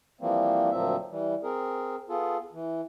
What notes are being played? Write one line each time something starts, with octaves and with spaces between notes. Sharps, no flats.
E3 F3 G3 A#3 C4
D2 A#2 F3 F#3 C4 E5
E3 G3
C4 G#4 A#4
B3 F4 G#4 A4
E3